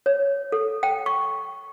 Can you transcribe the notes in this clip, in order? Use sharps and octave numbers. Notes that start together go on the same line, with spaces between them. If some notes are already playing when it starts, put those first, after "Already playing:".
C#5
A4
G5
C#6